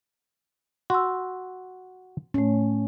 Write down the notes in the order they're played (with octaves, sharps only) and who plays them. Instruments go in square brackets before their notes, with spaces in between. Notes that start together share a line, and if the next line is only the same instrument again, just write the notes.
[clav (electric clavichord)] F#4 [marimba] C6 E6
[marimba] A2 A3 [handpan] C#4